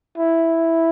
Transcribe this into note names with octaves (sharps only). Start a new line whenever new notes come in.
E4